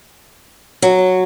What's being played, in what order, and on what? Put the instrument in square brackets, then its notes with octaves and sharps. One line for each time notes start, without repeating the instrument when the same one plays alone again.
[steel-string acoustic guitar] F#3